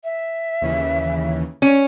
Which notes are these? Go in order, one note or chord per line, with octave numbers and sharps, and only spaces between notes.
E5
D#2 C#3 E3
C#4